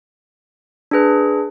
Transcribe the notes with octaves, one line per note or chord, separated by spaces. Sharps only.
D4 G#4 B4